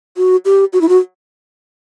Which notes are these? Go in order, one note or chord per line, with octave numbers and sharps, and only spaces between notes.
F#4
G4
F#4
E4
F#4